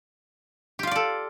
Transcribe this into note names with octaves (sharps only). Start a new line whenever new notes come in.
F4 G4 A4 D5 F5